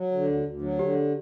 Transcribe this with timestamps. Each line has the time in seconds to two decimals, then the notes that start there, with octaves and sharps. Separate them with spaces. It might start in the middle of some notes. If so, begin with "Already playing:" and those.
Already playing: F#3 F#4
0.11 D3
0.27 D2
0.46 D2
0.62 F#3
0.79 D3 G4